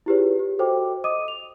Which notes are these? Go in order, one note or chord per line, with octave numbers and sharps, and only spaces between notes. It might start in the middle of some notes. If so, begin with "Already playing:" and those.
E4 F4 G4 G#4 B4 C#5
G4
F#4 A4 C5 D#5 G5 D6
D#5 D6 D#6 D#7
F7